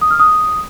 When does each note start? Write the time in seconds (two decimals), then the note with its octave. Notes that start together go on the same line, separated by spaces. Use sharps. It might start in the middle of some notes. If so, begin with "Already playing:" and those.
0.01 D#6
0.10 F6
0.19 D#6